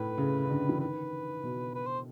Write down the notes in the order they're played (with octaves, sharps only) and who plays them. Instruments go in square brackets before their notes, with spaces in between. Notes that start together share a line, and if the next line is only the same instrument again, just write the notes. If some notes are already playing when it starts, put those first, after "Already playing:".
Already playing: [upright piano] A2 [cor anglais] B4
[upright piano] C#3
C#3
D3
E3
[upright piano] D#3 [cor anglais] B4
[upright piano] B2
[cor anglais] B4
C5